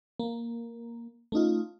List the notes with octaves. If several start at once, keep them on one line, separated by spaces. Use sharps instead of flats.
A#3
A3 C#4 D#4 F4